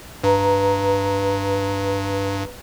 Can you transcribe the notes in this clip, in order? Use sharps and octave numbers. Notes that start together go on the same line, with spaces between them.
G2 B4 A#5